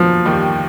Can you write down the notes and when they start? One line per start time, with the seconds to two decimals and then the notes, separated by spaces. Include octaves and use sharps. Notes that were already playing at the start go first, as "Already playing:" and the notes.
Already playing: A#2 F3 F#3 B3
0.25 D#2 D#3 G3